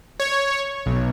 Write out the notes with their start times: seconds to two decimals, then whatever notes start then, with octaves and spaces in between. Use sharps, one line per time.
0.20 C#5
0.86 B1